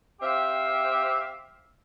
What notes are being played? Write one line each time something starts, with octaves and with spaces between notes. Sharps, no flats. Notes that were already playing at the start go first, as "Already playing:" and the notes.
C4 G4 E5 F5